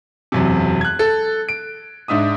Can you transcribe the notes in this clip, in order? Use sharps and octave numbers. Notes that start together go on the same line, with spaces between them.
E1 F#2 C3
F#6 G#6
A4
D7
G#2 D4 E5 D#6